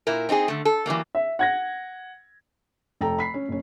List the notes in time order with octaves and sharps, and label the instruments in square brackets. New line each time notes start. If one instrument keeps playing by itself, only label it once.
[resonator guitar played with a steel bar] A#2 E4 A#4
C4 D#4 F#4 G#4
D3 A3
A4
E3 F#3 G3 A#3
[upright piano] E5
F#5 G#6 A#6
[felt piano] F1 A4 G5 A#5
B5 B6 C7
C#4
F#1 C#4